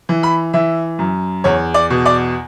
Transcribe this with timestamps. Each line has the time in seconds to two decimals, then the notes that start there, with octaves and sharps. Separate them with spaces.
0.09 E3
0.23 B5
0.53 E3 E5
0.99 F#2
1.44 E2 C#5
1.74 D5
1.90 B2
2.06 D5